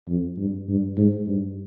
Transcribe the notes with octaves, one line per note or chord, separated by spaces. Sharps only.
F2
G2
G2
G#2
G2